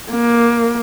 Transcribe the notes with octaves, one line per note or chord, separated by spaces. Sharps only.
A#3